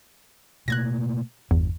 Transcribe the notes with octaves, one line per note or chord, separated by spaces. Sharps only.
B2 A3 A#3 F#6 G#6 A#6
G1 E2